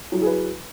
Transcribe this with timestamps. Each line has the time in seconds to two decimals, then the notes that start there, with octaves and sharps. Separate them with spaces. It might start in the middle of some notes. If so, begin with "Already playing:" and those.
0.12 F#3
0.17 E4
0.22 G#4
0.26 B4